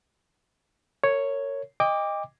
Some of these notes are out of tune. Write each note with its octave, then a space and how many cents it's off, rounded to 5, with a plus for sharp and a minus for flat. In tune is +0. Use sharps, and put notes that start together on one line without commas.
A#4 -30 C#5 +0
D#5 +0 G5 +35 D6 +0